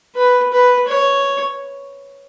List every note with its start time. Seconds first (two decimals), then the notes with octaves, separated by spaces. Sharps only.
0.16 B4
0.53 B4
0.89 C#5